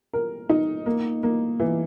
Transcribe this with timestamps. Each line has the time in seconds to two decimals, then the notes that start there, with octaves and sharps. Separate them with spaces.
0.14 A#4
0.49 D#4
0.86 A#3
1.23 A#3
1.60 E3